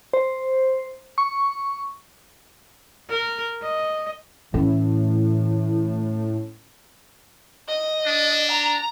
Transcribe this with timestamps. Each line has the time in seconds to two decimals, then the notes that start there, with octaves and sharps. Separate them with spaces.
0.14 C5
1.18 C#6
3.10 A#4
3.63 D#5
4.54 A2 E3 C#4
7.68 D#5
8.06 D4
8.51 A#5